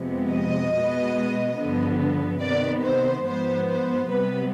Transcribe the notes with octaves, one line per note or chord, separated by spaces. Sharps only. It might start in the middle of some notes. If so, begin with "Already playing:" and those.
Already playing: F2 C3 F3 G#3 B3
D#5
B2 G#3 B3
G2 D3 F3 B3
C3 D#3 B3 D5
C5
G#2 F3 B3 C5
C5
C3 G3 B3 B4